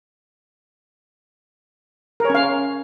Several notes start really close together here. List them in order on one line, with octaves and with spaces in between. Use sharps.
A#4 C#5 C#4 F5